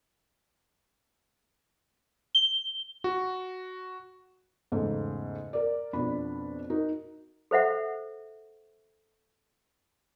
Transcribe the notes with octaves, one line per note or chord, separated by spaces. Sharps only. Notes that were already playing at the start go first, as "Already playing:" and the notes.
G7
F#4
E2 G#2 C#3 A3
A#4 D5
F2 B2 D4 B5
D#4 F#4 A#4
A4 C5 E5 F#5